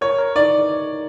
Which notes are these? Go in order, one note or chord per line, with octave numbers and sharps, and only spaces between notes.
A#4 C#5
A#4
D#4 D5